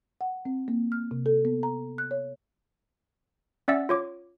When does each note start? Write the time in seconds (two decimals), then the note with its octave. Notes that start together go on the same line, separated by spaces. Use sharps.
0.21 F#5
0.45 C4
0.68 A#3
0.92 F6
1.11 C3
1.26 A4
1.45 B3
1.63 A#5
1.98 F#6
2.11 C#5
3.68 C#4 D5 E5 F#5 E6 A6
3.89 F4 C#5 D6